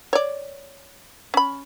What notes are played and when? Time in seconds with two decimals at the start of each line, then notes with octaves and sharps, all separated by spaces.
0.13 C#5 D5
1.34 C#4 B5